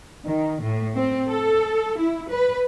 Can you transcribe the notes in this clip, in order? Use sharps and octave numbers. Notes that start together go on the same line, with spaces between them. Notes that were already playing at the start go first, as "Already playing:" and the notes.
D#3
A2
C4
A4
E4
B4